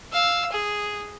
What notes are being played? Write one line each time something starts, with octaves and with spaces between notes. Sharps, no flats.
F5 E6
G#4